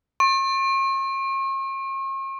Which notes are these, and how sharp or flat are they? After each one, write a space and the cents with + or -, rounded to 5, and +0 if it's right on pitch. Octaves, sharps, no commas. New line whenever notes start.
C#6 -45